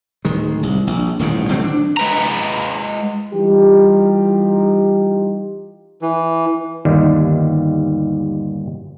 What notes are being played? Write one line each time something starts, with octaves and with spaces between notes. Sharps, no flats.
D1 D#3 G#3
C2
A#1
D#1 A1 G#2 D#3
D3 F#3 A3 C4
D4
G#3 B4 A#5
E3 G3 D#4 F4 G4
E3
G1 D#2 D#3 G3